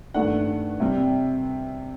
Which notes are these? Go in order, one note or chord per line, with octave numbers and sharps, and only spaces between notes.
G2 D#3 A3 D4 F#5
C3 G3 C4